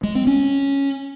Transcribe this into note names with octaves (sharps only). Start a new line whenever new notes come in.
G#3
C4
C#4